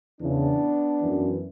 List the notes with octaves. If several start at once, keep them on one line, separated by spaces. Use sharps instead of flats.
E2 C#3 E3 B3 D4
F#2 E3